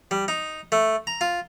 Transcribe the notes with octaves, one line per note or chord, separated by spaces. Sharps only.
G3
D#4
A3
A#5
F4